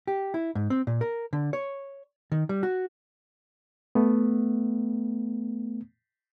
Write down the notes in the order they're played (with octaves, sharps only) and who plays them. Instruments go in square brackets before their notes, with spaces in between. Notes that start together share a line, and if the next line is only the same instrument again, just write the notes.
[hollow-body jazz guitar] G4
E4
G#2
C4
A#2
A#4
D3
C#5
D#3
G3
F#4
[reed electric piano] A3 B3